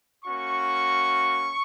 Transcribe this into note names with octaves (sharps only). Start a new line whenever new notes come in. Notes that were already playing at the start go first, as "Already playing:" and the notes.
A#3 C#4 F#4 C#6